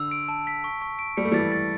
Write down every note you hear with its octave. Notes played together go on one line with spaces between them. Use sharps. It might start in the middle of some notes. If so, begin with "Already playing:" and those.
Already playing: D3 E6
D7
A5
B6
C#6
C#6
D7
G3 C#7
A3
E3 G3 A6
A6